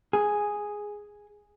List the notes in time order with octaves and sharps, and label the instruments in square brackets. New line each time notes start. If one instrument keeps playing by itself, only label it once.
[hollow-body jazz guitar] G#4